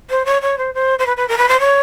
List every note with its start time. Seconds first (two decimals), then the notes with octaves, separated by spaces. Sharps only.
0.10 C5
0.25 C#5
0.42 C#5
0.58 C5
0.74 C5
0.99 C5
1.06 B4
1.17 B4
1.28 A#4
1.38 B4
1.49 C5
1.60 C#5